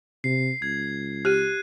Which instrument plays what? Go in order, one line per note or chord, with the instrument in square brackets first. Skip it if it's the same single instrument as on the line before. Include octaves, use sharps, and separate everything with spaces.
[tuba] C3 [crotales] C7
[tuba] C#2 [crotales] G#6
[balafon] G4 [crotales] F#6 D#7